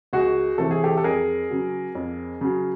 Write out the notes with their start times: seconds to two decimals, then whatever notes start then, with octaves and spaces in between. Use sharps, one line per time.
0.13 C#2 F#4 G#4
0.58 C3 E3 A3 A4
0.71 G#4
0.84 G4 A4
0.97 A4
1.04 F2 G#4 A#4
1.50 C#3 F#3
1.95 F2
2.41 C#3 F#3